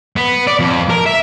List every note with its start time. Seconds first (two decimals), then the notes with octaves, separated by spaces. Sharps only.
0.17 B3
0.47 D5
0.60 F2
0.89 A#4
1.06 E5